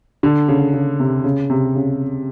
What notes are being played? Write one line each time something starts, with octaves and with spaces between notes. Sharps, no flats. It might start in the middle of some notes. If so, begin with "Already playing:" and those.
D3
C#3
C#3
C3
C#3
C3
C#3